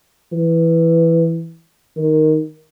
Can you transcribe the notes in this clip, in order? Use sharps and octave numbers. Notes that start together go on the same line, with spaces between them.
E3
D#3